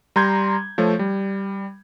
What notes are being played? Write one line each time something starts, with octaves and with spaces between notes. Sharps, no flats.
G3 A#5 C6 G6 G#6
F3 A3 C#5
G3